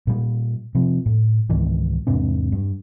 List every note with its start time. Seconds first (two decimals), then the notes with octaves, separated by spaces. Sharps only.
0.07 A#2 G3
0.75 C3 F3
1.06 A2
1.50 C#2 G#2 D#3 E3
2.07 E2 G#2 C3 D4
2.52 G2